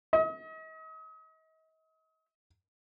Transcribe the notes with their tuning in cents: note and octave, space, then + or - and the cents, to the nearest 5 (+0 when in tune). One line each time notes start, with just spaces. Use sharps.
D#5 +40